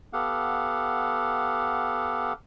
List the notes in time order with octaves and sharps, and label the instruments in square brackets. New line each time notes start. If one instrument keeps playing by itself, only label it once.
[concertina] B3 G4 A4 F5 F#5